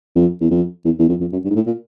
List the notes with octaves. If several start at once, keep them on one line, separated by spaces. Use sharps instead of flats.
F2
E2
F2
E2
E2
F2
F2
F#2
G2
G#2
A2
A#2